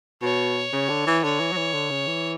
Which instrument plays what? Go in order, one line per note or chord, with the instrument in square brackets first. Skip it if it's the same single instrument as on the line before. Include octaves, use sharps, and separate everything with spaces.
[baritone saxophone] B2 [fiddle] C#5
[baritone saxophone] C#3
D3
E3
[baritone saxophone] D3 [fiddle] C#5
[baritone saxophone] E3
F#3
E3
D3
C#3
E3